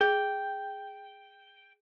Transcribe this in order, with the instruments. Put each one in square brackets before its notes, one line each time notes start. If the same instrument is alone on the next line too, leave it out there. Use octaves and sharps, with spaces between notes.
[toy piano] G#4 [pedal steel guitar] G5